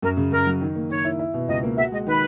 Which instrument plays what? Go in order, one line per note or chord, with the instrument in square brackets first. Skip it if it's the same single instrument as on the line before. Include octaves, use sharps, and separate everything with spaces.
[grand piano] F#2 [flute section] A#4
[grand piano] C#3
[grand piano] F#2 [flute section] A#4
[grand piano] F#3
D#3
A#3
[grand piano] D#3 [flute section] C#5
[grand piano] E4
E4
B2
[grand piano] C#2 [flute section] D#5
[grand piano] A#3
[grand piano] F#4 [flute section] E5
[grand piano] G#3 [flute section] D#5
[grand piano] D#3 [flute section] B4